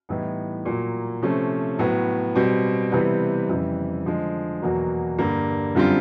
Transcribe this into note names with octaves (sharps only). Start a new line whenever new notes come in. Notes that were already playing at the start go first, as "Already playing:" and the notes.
A2 E3 G3 B3 D#4
A#2 F#3 A#3
C3 F3 A3 C#4
A2 F#3 B3
B2 G3 C4
C3 E3 G3 B3
F2 C#3 E3 G3
D3 F3 G#3
E2 B2 F#3 A#3
G2 D3 G3 A#3
F#2 D3 G3 C4 F4